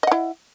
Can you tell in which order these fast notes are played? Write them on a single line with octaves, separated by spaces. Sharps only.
D#5 F#5 E4